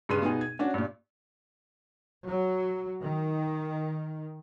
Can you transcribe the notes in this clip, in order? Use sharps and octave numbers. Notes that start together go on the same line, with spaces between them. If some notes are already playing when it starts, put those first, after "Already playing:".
G2 C#3 G#3 B4 C6 D#7
B2 B3 D#4 G#4
G#6
C#4 D4 F#4
G2 A#2
F#3
D#3